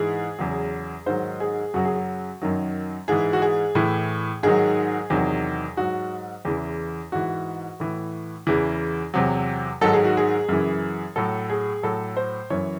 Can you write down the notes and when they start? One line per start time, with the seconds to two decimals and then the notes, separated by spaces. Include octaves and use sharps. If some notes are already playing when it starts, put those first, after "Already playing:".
Already playing: G#2 E3 G#4
0.39 E2 C#3 F#3
1.06 G#2 D#3 F#3 C5
1.40 G#4
1.74 F#2 C#3 F#3 F#4
1.85 G#4
1.96 F#4
2.42 F#2 D#3 F#3
3.08 G#2 E3 G#4
3.33 F#4
3.42 G#4
3.75 A2 E3
4.43 G#2 D#3 F#3 G#4
5.10 E2 C3 D#3 F#3
5.77 G#2 F#3 F#4
6.45 E2 C#3 E3
7.12 G#2 E3 F#4
7.80 A2 E3
8.47 E2 C#3 E3
9.14 E2 C3 F#3
9.81 G#2 D#3 F#3 A4
9.93 G#4
10.05 F#4
10.17 G#4
10.49 F#2 C#3 E3
11.16 A2 F#3 A4
11.50 G#4
11.83 A2 F#3 A4
12.17 C5
12.50 F#2 E3 C#5